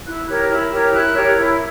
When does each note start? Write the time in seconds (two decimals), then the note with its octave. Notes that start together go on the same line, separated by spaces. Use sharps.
0.06 E4 F#6
0.28 G4 A#4 C#5
0.49 E4
0.71 G4 A#4 C#5
0.93 E4 F#6
1.15 G4 A#4 C#5
1.36 E4